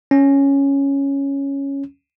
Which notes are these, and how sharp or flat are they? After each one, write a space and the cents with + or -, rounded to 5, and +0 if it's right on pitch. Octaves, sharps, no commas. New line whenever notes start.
C#4 +0